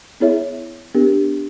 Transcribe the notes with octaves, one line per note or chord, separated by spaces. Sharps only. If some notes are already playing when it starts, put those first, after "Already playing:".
B3 E4 G#4 C#5 E5
B3 D4 G4 A#4